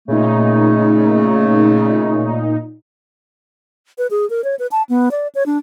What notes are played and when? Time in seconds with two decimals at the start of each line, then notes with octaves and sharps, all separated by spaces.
0.08 A#2 C#3 A3 D#4
3.98 B4
4.10 G#4
4.30 A#4
4.44 C#5
4.59 B4
4.71 A5
4.89 B3
5.11 D5
5.35 C#5
5.46 D4